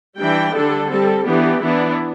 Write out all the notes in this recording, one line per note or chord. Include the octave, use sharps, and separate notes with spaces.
E3 G3 D4 G5
D3 G3 D4 A4
G3 C4 A4
E3 B3 D4 G4
E3 B3 D4 E4